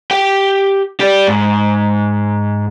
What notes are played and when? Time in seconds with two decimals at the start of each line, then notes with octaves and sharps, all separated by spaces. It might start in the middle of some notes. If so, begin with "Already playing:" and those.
0.11 G4 G5
1.00 G4 D5
1.27 G#2